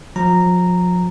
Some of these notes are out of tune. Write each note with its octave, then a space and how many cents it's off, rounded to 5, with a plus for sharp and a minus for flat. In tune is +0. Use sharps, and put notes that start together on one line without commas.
F3 +40 A#5 -10